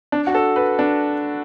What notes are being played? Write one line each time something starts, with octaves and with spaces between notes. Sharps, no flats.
D4
F#4
A4
B4
D4